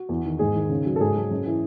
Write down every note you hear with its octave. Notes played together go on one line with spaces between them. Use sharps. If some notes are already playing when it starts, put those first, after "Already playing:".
Already playing: F#4
E2
D#3
G#2 G#4
D#3
C#3
F#3
A4
G#2 G#4
F#3
F#2
E3